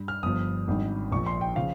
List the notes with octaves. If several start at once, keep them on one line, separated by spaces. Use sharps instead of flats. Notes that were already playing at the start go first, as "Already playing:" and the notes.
Already playing: G2
F6
G1 G2 F3 D#6
G#1 G2 D#3
A#1 A#2 F3 C#6
C6
G5
C#3 F3 F5